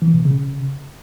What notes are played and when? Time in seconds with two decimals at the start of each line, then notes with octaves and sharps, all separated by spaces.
0.02 E3
0.14 B2
0.25 C#3